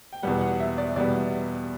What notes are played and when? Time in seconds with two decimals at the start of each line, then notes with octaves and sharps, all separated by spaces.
0.13 G5
0.23 E2 B2 G3 F#5
0.41 F#5
0.60 E5
0.78 D5
0.96 E2 B2 G3 D5